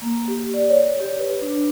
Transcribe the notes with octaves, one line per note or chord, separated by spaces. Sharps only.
A#3
G4
D5
C#5
G4
B4
D4